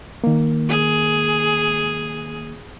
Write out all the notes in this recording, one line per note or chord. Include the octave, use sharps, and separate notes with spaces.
D#3 A#3
G#4